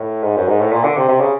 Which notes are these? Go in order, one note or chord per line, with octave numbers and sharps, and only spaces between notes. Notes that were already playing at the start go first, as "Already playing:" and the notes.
Already playing: A2
G#2
F#2
G#2
A2
A#2
D3
C3
C3
C#3